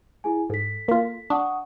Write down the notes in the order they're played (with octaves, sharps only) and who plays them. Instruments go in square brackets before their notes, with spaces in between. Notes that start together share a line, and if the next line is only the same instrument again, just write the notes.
[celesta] E4 G#4 G#5
[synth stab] G#2 [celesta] A4 B6
[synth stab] A#3 F4
[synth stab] D4 [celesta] F#5 C#6 D#6